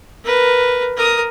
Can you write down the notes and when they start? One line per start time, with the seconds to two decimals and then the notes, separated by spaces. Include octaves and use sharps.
0.24 A#4 B4
0.97 A#4 D#6